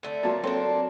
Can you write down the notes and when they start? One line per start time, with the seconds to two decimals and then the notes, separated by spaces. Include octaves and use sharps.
0.03 D3 A3
0.23 F#3 A#3 A5 C6
0.44 C4 D4 A4 C5 C#5